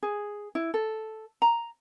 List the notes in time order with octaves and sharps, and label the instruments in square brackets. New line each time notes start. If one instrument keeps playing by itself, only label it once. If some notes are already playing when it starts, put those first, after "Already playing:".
[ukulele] G#4
E4
A4
A#5